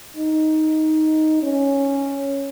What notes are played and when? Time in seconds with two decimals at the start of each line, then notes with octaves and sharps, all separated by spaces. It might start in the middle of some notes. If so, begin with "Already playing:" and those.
0.17 D#4
1.43 C#4